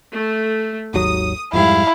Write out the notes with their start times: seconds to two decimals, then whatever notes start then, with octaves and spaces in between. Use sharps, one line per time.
0.14 A3
0.94 G#1 D#2 F#3 D#6
1.53 F2 G#2 G3 E4 F5